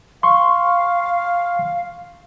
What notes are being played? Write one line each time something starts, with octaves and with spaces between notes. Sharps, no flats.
F5 C6 C#6